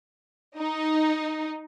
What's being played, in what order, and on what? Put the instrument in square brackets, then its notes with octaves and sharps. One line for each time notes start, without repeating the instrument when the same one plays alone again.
[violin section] D#4